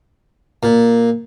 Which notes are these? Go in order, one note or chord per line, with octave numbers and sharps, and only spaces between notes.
A#2